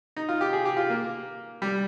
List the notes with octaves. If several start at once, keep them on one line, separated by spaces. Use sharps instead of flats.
D#4
F4
G4
G#4
G4
F4
A#3
G3